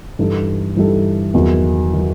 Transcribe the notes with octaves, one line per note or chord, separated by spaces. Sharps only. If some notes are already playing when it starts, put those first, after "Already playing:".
G2 E3 G3 D#4 A4
G2 E3 G3 D#4 A4
E2 D#3 F#3
D#3 F#3